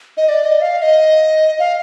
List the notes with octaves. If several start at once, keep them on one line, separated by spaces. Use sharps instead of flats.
D#5
D5
D#5
F5
F5
D#5
F5